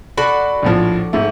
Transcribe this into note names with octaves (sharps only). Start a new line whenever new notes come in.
F#4 A4 D5 B5
A#1 A2 F3
G#2 A3